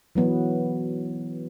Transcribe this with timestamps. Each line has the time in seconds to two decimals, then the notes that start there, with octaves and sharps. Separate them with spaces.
0.15 E3 F#3 B3